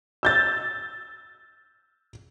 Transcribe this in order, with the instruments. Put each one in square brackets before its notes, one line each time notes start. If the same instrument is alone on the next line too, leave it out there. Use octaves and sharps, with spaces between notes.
[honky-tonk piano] E6 G6 A6